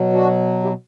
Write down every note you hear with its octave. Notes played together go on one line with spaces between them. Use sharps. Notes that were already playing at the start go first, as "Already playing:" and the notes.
Already playing: B2 F#3
D4 F#4
E4 G4